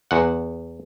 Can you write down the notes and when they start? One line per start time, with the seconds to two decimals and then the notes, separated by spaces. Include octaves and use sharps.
0.11 E2 F#5